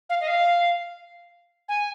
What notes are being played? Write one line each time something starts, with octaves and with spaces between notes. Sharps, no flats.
F5
D#5
F5
G#5